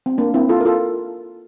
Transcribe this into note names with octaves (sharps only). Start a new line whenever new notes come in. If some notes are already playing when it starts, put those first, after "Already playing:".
C4
A#3 D4
C4 E4
F4 A4
A#4
F4 A4